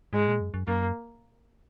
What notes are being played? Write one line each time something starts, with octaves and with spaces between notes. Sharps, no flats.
G#2 G#3
A#2
F#2
F#2
F#2 A#3